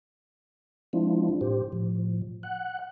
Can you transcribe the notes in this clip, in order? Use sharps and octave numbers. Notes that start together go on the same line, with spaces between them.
F3 G#3 C4 D4 E4 F4
A2 G4 C5
A2 F3
F#5 F#6